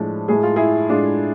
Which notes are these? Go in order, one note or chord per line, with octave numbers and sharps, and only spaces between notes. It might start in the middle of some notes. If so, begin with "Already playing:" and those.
Already playing: A2 F3 G#3 D4
A2 G#3 G#4
F4
E4 G#4
A2 G#3 D4 F4